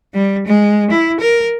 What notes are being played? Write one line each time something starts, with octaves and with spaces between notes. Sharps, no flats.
G3
G#3
E4
A#4